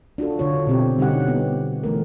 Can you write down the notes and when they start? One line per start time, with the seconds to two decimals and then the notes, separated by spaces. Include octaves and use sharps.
0.18 D4 F4 F#4 A4
0.39 D3 F4 C#5
0.67 B2 C4 G4
0.98 D3 G3 C#4 D#4 G4 F#5
1.28 B3
1.83 E3 A3 A#4